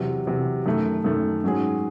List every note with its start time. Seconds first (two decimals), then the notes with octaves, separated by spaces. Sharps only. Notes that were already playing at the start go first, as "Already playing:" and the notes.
Already playing: E2 C3 F#3
0.27 E2 C3 F#3
0.66 F#2 D#3 A3
1.04 F#2 D#3 A3
1.44 G#2 F#3 C#4 G#4